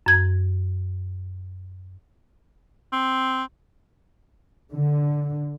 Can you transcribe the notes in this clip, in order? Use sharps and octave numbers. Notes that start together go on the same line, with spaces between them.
F#2 G#6
C4
D3